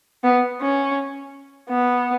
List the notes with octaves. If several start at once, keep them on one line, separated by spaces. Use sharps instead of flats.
B3
C#4
B3